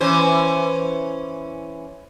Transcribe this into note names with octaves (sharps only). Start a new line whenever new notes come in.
E3 C#4 C5